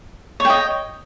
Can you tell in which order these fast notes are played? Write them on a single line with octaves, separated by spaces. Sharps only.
C#5 G5 D#5